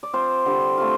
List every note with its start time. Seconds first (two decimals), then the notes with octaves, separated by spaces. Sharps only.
0.03 D5
0.13 F3 C4 F4 C5
0.45 D3 G3 C4
0.77 A3 C4 F4